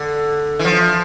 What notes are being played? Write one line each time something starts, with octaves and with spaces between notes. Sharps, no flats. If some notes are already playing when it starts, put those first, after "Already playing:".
Already playing: D3
E3
F3